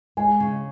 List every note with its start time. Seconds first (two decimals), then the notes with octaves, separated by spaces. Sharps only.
0.17 G#3 G#5
0.40 C#3